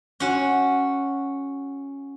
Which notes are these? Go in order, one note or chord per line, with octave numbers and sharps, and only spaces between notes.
C#4 F#4